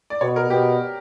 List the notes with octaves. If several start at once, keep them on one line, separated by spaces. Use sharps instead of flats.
D5
B2 C#5
A#4
B2 G4